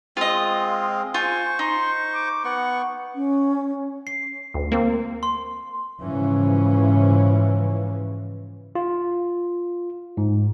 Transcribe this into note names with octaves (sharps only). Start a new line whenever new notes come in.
G#3 C4 F4 D#5
F5
F4 C5 G#5 C#6
D#4 C6
D6
B3 F#5 C#6
C#4
C7
D2
A#3 C4
C6
G#2 C#3 E3 F3 C#4
F4
G#2